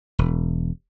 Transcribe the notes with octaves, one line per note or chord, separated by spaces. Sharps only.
E1